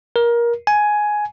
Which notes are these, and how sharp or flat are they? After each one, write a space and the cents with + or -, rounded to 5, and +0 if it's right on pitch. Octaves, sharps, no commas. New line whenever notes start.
A#4 +20
G#5 +10